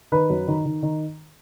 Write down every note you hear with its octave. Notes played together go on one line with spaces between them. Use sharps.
D#3 B4
F#2
D#3
D#3
D#3